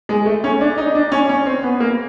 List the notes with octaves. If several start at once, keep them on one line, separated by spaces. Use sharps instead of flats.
G#3
A3
C#4
D4
D#4
D4
C#4
C#4
C4
B3
A#3